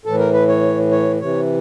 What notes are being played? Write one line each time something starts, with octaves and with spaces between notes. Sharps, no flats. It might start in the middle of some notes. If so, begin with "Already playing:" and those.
A2 E3 A4
A#4
B4
C#5
C#5
C3 E3 C#5